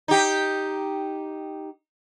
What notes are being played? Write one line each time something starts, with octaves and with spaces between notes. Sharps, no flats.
D#4 G4